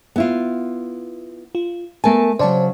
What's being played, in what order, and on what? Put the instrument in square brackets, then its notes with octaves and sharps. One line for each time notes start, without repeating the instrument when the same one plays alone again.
[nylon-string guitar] B3 E4 F4
[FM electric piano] F4
[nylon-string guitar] A3 G#5 [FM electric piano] B3 A#4 A5
[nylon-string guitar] C#3 F#3 [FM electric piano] C5 D5 A5